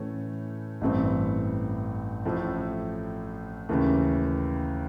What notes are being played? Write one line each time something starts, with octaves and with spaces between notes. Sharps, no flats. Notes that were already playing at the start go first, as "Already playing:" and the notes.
Already playing: A2 E3 A3 C#4
A1 G2 E3 A3 C4
A1 A2 F3 A3
D#2 C#3 E3 A3